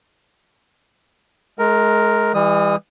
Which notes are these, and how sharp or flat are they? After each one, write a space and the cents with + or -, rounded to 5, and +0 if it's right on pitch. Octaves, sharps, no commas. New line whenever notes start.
G#3 +35 A#4 +0
E3 +0 G3 +45 D#6 +5